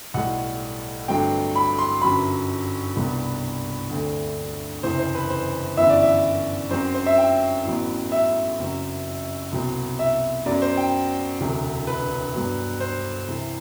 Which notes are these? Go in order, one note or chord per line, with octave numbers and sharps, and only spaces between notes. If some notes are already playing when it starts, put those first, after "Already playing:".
B1 A2 G3 F#5
G1 G2 F#3 A3 C4 G5
B5
C6
G1 F#2 F#3 B5
C2 B2 G3 B3
D2 D3 A3 C4
F#1 E2 C3 E3 C5
C5
B4
C5
G1 F#2 E3 B3 E5
D5
E5
F#2 F#3 C4 C5
C5
E5
G5
A1 A2 F#3 B3
E5
F#1 F#2 F#3 C4
C2 B2 F#3 C4
E5
F#2 F#3 B3 D5
C5
G5
E1 D2 C3 F#3
B4
G2 F#3 B3
C5
C2 C3 E3